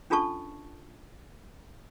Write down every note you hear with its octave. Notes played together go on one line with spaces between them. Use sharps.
C#4 D4 F4 A4 A5 C#6